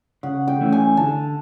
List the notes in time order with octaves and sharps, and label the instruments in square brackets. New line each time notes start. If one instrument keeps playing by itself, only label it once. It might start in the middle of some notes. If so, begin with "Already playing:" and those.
[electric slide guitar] C#3 [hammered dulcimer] F#5
[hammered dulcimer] G5
[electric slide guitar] E3 A3 C#4 E4
[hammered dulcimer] G#5
[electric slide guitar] D3 [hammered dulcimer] A5